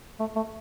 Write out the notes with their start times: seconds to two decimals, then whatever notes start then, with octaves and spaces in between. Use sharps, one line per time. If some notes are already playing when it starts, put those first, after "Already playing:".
0.20 A3
0.36 A3